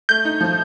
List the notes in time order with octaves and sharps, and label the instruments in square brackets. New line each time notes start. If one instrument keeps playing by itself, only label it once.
[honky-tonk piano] A3 [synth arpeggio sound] G6
[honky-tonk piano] D#4
F3